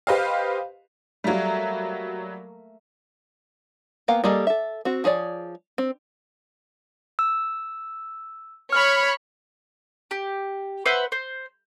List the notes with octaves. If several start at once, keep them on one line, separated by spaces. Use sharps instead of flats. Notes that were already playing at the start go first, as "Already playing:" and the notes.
G4 B4 C5 D#5 F5
F#3 G3 A3 A#3
A#3 B3 F5 G5
G3 A#3 G#4 A4 D#5
A4 E5
C4 F#4
F3 G#4 C#5 D5
C4
E6
C#5 B5 F6
G4
B4 C5 E5 F#5
C5